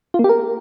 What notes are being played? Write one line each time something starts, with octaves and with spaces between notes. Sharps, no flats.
F4
A#3
G4
A#4